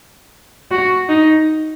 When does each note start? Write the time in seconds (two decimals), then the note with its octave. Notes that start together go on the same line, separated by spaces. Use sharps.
0.71 F#4
1.09 D#4